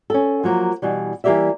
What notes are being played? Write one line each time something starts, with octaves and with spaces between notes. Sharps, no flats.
C#4 A4
F3 F#3 A#3
B2 E3 G3
E3 G3 A#3 G4 D5 E5